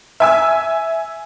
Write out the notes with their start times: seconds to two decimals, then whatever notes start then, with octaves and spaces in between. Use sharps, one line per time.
0.20 E5 G#5 E6